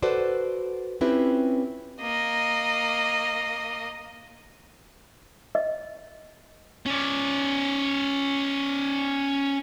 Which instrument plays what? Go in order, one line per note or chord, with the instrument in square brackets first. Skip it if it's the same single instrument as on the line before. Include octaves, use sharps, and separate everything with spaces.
[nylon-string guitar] F#4 A4 B4 C5 D5
C4 C#4 E4 F4 G4 B4
[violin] A#3 D#5
[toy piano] D#5
[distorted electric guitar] C#4 D5